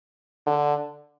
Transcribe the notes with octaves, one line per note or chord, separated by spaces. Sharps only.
D3